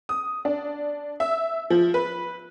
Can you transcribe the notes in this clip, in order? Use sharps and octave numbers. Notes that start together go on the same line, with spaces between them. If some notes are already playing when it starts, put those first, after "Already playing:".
D#6
D4
E5
F3
B4